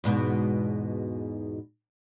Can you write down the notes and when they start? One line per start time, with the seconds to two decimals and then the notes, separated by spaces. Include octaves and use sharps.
0.04 E2 G#2 B2